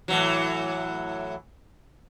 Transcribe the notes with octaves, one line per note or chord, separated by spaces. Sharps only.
A2 E3 F#3